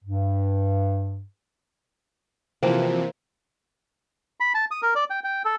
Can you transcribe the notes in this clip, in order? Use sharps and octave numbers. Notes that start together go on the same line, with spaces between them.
G2
C3 E3 F3 A#3 C4 E4 F#4 F5
B5
A5
D#6
A#4
D5
G5
G5
A4